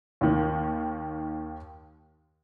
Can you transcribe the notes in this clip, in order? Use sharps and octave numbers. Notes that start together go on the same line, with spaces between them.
D#2 D#3